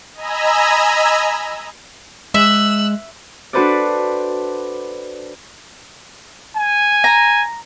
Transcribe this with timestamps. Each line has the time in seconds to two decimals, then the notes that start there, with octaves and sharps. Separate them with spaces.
0.15 D#5 G#5 A#5 B5 E6
2.34 G#3 E5 E6 F#6
3.53 D4 F#4 A4 B4 C5 D5
6.57 G#5
7.04 A#5